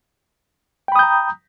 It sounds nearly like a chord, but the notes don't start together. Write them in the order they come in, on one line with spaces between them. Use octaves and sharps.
G5 B5 D#6 G6 A#5